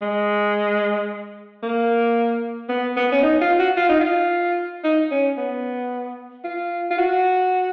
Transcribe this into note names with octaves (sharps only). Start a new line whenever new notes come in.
G#3
A#3
B3
B3
C#4
D#4
F4
F#4
F4
D#4
F4
D#4
C#4
B3
F4
F4
F#4